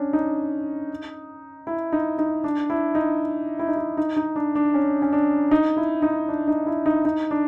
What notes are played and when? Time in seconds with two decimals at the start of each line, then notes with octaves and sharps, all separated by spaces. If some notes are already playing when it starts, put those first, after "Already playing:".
Already playing: C#4 D4
0.13 D#4
1.67 E4
1.92 D#4
2.18 D#4
2.44 D4
2.70 E4
2.95 D#4
3.59 E4
3.68 D#4
3.76 E4
3.97 D#4
4.16 D#4
4.36 D4
4.55 D4
4.74 C#4
5.02 C#4
5.13 D4
5.51 D#4
5.77 E4
6.02 D#4
6.28 D4
6.47 D#4
6.67 E4
6.86 D#4
7.05 D#4
7.31 D4